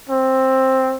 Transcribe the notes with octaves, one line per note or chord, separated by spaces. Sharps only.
C4